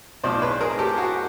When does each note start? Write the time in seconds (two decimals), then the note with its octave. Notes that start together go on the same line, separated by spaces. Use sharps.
0.24 B1 A2 F3 G#3 C4 C5 D5
0.42 B4 C#5
0.61 G#4 A#4
0.79 G4 A4
0.97 F#4 G#4